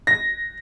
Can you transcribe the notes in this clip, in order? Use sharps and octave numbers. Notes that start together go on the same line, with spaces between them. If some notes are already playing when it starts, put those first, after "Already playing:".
A#6